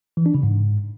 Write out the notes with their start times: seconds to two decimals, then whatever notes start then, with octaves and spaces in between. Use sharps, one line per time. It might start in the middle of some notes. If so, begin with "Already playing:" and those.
0.17 E3
0.26 D4
0.34 C#3
0.43 G#2